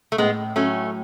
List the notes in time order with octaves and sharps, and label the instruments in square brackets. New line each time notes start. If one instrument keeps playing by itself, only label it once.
[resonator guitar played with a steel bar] A3
[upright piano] A2 [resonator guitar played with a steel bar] G#3 B3
[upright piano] F#3 [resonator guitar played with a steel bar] A3 C#4